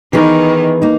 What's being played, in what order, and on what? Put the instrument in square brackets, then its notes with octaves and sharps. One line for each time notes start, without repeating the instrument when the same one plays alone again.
[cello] D#3 [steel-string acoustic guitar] E3 B3 D#4 G#4
[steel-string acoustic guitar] A#3 D#4